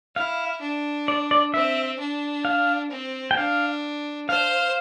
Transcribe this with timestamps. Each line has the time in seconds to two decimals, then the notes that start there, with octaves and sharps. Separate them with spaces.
0.16 E4 F5
0.61 D4
1.08 D5
1.31 D5
1.54 C4 E5
1.99 D4
2.45 F5
2.91 C4
3.31 G5
3.37 D4 F5
4.29 C5 F5